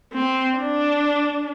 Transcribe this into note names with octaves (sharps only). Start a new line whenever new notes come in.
C4
D4